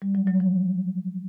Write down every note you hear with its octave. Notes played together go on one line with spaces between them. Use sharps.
G3
F#3
F#3
F3